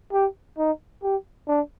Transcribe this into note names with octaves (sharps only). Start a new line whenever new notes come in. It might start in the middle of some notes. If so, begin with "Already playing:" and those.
G4
D#4
G4
D4